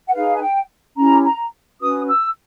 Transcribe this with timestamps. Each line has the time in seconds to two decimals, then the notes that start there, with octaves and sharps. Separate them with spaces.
0.07 F#5
0.12 D#4 G#4 B4 F5
0.34 G#5
0.40 G5
0.96 C#4 E4 G4 A#5
1.24 A#5
1.80 C#4 F#4 B4 D#6
2.08 E6